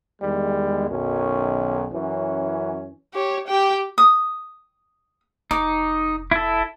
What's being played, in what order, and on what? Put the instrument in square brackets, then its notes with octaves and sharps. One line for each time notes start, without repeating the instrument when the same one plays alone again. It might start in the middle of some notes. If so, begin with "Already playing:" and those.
[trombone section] E2 D#3 G3 G#3
B1 F#2 D#3 C#4
F#2 E3 C#4
[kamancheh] G4 C#5
G4 G5
[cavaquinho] D#6
[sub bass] F1 [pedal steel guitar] D#4 [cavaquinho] D6
[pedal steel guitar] E4 A4